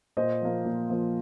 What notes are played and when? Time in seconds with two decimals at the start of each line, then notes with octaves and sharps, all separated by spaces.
0.17 A#2 C5 D#5
0.42 F3 A#3
0.65 A#2
0.89 F3 A#3